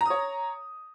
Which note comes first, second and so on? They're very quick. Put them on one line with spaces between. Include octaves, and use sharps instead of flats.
A#5 D#6 C#5